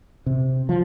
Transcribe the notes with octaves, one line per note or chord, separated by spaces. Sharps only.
C3
F3